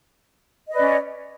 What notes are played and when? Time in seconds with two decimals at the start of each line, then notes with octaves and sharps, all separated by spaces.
0.68 D#5
0.72 B4
0.75 D5
0.79 C#4